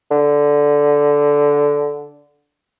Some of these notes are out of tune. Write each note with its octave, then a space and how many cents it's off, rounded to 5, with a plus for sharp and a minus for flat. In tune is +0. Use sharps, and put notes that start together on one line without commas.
D3 -10